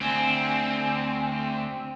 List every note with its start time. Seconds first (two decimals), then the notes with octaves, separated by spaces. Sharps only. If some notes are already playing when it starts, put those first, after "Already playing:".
0.01 D2 C4 G#5